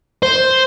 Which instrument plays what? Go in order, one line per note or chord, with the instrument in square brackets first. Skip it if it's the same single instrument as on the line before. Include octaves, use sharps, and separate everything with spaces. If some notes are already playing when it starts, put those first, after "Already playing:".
[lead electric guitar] C5